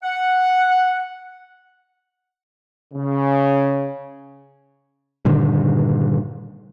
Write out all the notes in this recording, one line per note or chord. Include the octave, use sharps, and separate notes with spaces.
F#5
C#3
G2 A#2 D3 D#3